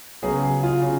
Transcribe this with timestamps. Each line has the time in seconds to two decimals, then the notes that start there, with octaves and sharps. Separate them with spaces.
0.23 C#3 F#3 B3 G#4
0.43 G#4
0.63 F4
0.82 C#3